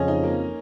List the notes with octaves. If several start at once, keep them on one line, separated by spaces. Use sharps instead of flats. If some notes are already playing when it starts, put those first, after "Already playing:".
Already playing: F2 C#3 F3 C#4 D#5
D#4
A#3